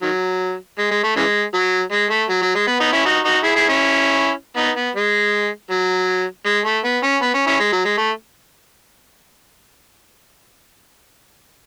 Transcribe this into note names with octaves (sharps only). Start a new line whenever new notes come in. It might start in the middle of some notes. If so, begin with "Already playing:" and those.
D#3 F#3
G#3
G#3
A3
C#3 E3 G#3
F#3
G#3
A3
F#3
F#3
G#3
B3
B3 D#4
C#4 E4
D#4 F#4
D#4 F#4
E4 G#4
E4 G#4
C#4 E4
B3 D#4
B3
G#3
F#3
G#3
A3
B3
C#4
B3
C#4
C#4 E4
G#3
F#3
G#3
A3